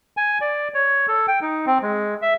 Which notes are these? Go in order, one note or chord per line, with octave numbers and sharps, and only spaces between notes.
G#5
D5
C#5
A4
G5
D#4
C4
G#3
E5